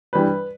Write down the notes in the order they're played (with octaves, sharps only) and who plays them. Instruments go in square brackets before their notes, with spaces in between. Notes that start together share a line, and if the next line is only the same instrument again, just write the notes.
[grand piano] G2 E3 G3 B4